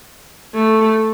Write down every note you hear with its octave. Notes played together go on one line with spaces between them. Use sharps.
A3